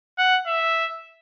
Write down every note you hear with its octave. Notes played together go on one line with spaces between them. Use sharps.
F#5
E5